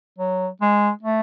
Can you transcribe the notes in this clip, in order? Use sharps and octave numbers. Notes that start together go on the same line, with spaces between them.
F#3
G#3
A3